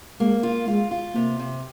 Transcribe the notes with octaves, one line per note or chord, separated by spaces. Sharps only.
G#3 A#3
F4
G#3 F4
F4
C3 A#3
C3